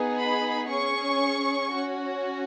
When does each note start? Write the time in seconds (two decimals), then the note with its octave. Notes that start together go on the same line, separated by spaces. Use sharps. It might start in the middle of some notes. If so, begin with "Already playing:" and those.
Already playing: B3 D#4 G#4
0.19 B5
0.69 C#4 G#4 C#6
1.71 C#4 F#4